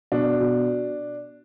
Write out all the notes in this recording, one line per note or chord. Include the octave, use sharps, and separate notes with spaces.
B2 D4
B2